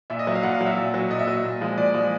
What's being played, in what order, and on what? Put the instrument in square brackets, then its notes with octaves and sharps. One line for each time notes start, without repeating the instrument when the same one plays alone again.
[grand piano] A#2 E5
D#5
F#3 E5
F5
A#2 F#5
F5
F#3
E5
A#2
F#3
A#2 D#5
E5
F#3 D#5
A#2
F3 G#3
A#2 D5
F3 G#3